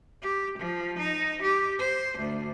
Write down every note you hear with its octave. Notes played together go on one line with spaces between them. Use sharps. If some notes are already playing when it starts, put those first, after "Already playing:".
G4
F3
D#4
G4
C5
D2